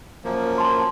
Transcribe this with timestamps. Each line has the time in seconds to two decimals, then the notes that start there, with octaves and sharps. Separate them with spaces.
0.24 F#2 F3 A#3
0.58 A5 C6